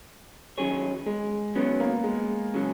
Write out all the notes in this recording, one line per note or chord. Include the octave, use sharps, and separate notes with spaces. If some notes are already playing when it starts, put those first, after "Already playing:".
D#3 F#3 C#4 G#4 C#5
G#3
D#3 F#3 B3 C#4
A#3
G#3
C#3 F#3